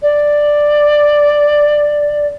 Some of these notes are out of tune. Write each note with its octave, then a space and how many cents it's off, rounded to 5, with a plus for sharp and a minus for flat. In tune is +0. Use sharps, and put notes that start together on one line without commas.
D5 +5